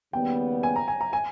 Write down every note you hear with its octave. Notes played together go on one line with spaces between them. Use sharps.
D#2 C#3 G3 B3 G5
G#5
A#5
G#5
A#5
G#5